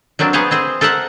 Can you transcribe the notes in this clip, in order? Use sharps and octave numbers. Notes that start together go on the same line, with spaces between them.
F#3 A#3 C4 D4
B3 G#4 C5 C#5 F5
C4 G#4 C5
A4 A#4 C5 E5 F#5